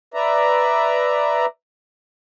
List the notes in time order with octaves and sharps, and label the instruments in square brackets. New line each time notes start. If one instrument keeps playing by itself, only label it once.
[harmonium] B4 D5 E5 A#5